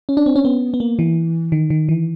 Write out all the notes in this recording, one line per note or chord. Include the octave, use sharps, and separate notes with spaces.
C#4
D4
C4
C#4
B3
B3
A#3
E3
D#3
D#3
E3